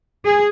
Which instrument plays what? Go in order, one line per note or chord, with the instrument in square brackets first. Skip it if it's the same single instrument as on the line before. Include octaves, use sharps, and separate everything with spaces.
[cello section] G#4